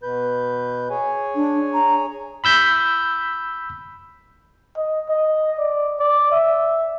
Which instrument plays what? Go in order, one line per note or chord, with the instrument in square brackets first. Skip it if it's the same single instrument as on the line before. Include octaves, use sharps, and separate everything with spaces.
[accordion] B2 B4 G6
G#4 C#5 G#5
[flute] D4
A#5
[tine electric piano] B5 E6 G6 B6
[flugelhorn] D#5
D#5
D5
D5
E5